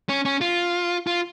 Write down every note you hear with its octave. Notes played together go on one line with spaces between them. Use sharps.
C#4
C#4
F4
F4